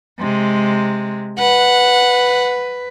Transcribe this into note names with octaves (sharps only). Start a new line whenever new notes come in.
C3 G#3
B4 F#5